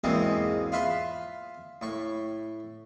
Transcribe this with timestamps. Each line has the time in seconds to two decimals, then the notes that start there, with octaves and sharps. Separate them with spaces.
0.04 E2 G#2 B2 G#3 A#3 C4
0.72 F4 B4 E5 B5 C6
1.82 A2 C#6